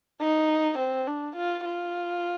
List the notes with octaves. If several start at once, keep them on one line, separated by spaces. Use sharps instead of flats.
D#4
C4
D4
F4
F4